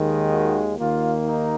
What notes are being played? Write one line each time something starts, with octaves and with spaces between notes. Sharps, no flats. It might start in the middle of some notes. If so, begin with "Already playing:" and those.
Already playing: D#2 D#3 G#3
F#4
D#2 D#3 A#3 F4
D#4